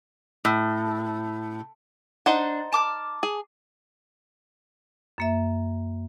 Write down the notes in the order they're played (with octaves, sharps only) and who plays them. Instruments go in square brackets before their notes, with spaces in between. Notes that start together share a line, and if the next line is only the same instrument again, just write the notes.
[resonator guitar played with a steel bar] A2
[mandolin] D4 [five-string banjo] D#4 C5 F#5
[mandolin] A5 D6 F6
[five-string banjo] G#4
[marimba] F#2 A#3 E5